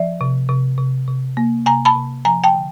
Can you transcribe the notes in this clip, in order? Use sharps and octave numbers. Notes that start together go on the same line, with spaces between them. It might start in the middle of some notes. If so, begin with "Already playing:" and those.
Already playing: F3 D5 E5
C3
C3
C3
C3
A#3
C3 G#5 A#5
A5 B5
C3
F3 G#5 A#5
G5 A5
D3